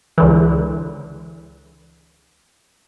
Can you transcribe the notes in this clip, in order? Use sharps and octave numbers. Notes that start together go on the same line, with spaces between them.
C#2 D3 E3